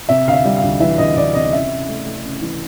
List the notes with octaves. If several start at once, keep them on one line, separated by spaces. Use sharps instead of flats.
C3 E5
D2 F5
E5
G3
F5
D2
E3 E5
D2 D#5
D2 D5
C3 D#5
C#3 E5
C#3
A3
A3
C#3
E3